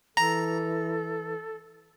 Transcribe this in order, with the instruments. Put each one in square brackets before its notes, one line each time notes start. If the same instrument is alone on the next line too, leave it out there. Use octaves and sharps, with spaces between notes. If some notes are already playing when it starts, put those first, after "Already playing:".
[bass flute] E3 [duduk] A4 [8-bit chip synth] A#5